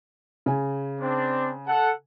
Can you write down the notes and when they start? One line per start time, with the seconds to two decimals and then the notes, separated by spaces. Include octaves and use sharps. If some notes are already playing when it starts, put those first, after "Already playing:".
0.46 C#3 G#5
1.01 C4 D4
1.67 A4 F#5